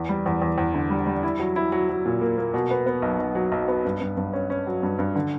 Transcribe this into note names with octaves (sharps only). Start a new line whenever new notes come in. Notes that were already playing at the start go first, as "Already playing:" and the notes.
Already playing: E2
G3
E2
E2
E2
D3
G3
G3
E4
F#3
E4
F#3
F#3
A#2
A#3
A#3
B2
B3
B3
B1
B1
F#3
B1
B3
G2
G2
G2
C#4
C#4
F#3
G2
G2
D3